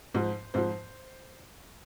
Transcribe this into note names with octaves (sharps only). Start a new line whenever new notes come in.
G#2 F3 C5
G#2 F3 C5